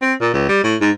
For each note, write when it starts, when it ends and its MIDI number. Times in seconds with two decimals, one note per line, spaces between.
0.02 0.14 60
0.21 0.29 46
0.33 0.48 37
0.49 0.62 55
0.64 0.76 45
0.81 0.90 44